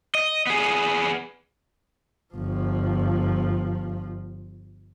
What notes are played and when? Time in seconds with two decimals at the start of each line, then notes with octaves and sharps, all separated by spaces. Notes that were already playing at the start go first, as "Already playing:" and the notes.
0.15 D#5
0.47 B3 G#4
2.34 G1 F3